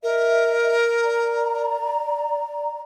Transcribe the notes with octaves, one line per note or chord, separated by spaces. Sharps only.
A#4 D#5 E5
D5 A#5